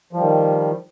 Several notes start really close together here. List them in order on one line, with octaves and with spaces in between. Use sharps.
F3 G3 D#3